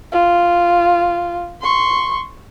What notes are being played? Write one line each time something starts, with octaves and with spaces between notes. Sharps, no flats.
F4
C6 C#6